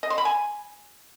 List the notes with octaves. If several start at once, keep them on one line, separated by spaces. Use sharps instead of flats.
D#5
C6
B5
G#5